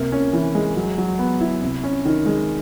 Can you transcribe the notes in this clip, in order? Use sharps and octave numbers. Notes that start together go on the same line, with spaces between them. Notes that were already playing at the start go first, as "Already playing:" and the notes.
Already playing: C3 A#3
C#4
E3
G#3
F#3
F#3
B3
E4
C3
C#4
D#3
G#3